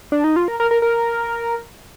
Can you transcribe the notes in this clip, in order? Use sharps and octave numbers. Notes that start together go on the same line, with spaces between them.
D4
D#4
F4
A#4
A#4
A#4
A#4